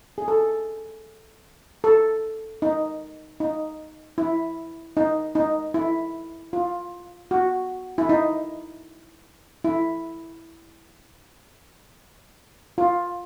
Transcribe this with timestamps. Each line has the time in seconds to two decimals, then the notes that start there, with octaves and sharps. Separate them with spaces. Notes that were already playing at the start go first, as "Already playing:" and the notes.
0.18 G#4
0.28 A4
1.84 A4
2.62 D#4
3.40 D#4
4.18 E4
4.97 D#4
5.35 D#4
5.74 E4
6.53 F4
7.31 F#4
7.98 E4
8.09 D#4
9.64 E4
12.78 F4